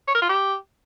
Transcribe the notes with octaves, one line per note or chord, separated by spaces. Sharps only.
C#5
A#4
F4
G4